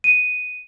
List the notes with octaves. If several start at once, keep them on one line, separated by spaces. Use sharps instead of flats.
D#7